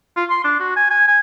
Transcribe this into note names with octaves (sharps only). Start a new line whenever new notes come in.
F4
C6
D4
F#4
G#5
G#5
G#5